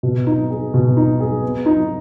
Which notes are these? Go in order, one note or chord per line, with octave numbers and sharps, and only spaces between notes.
B2
D#4
G#4
B2
D#4
G#4
B3
D#4